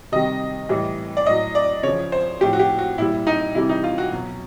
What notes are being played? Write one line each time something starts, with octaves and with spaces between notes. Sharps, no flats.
C3 D#3 G3 D#5
A2 E3 G3
D5
A2 F#3 D#5
D5
C#3 F3 C#5
C5
A2 F3 G4
F#4
G4
F#4
A#2 G3 E4
D#4
C3 E3 G3 E4
D#4
F4
F#4
B2 F#3